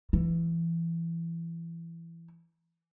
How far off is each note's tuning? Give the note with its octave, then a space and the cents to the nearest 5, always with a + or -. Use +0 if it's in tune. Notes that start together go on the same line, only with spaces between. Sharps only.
E3 +20